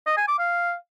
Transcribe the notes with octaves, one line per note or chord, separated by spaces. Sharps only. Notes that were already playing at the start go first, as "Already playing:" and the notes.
D#5
G#5
D6
F5